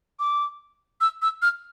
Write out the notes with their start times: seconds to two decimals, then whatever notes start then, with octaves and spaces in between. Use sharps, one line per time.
0.19 D6
1.01 E6
1.22 E6
1.42 F6